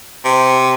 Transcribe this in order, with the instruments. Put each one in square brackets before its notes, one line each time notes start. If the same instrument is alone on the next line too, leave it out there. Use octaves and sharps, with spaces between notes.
[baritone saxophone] C3